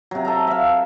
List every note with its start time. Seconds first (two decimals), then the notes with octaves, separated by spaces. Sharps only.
0.11 C3 F#3
0.25 A4 E5 A#5
0.47 E5 F5